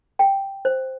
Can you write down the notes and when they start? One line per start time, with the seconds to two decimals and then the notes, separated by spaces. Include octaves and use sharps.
0.19 G5
0.65 C5